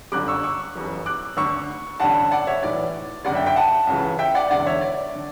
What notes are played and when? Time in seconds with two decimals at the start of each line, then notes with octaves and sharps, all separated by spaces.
0.12 G1 F#2 D3 D6 F#6
0.28 C#6 E6
0.43 C#6 E6
0.75 G1 F#2 E3
1.06 D6 F#6
1.37 D2 D3 C#6 E6
2.00 A1 G2 D3 F#5 A5
2.32 D5 F#5
2.47 C#5 E5
2.63 B1 A2 E3 D5
3.24 F#1 F#2 D3 D5 F#5
3.35 E5 G5
3.46 E5 G5
3.56 F#5 A5
3.87 C#2 C#3 E3
4.19 E5 G5
4.35 D5 F#5
4.50 E1 E2 D3 D5 F#5
4.66 C#5 E5
4.81 D5
5.15 D3